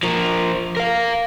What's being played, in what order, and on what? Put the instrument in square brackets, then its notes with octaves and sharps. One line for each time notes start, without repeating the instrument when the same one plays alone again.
[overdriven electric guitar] F3 A#4
A#4 F5